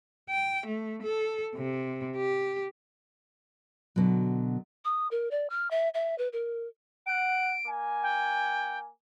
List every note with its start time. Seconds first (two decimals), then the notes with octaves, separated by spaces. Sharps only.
0.30 G5
0.67 A3
1.03 A4
1.56 C3
2.16 G4
3.96 B2 D3 F#3
4.85 D#6
5.11 A#4
5.31 D5
5.50 F6
5.71 E5
5.94 E5
6.18 B4
6.33 A#4
7.07 F#5 D7
7.67 A#3 G#5
8.03 G5